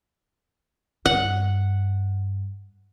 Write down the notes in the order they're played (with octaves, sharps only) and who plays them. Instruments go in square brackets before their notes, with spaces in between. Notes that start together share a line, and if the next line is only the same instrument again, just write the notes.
[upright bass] G2 [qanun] F#5